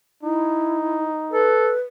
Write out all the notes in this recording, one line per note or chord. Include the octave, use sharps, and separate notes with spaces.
D#4 E4
A4 B4